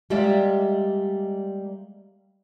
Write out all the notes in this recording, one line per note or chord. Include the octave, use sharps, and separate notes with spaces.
G3 G#3 A#3 G4 D5 E5